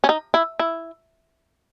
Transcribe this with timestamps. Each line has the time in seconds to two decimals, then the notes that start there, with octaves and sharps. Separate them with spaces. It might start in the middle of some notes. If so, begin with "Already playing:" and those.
0.04 C#4
0.09 D#4
0.34 E4
0.59 E4